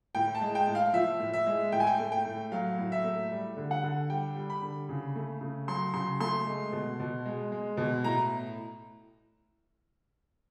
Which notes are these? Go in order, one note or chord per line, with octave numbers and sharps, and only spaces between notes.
A2 G5
A5
G#3
G5
A2
F5
F3 E5
A2
E5
G#3
A2 G5
G#5
G5
A3
G5
A2
F#3 F5
A2
E5
A3
G3
D3
F#5
D3
G3 G5
G3
B5
D3
C#3
A3
C#3
F#3 C6
C#3 C6
A3 C6
G#3
B2
B2
G#3
G#3
B2
A2 A#5